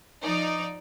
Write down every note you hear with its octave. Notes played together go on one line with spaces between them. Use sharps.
F3 D#4 D5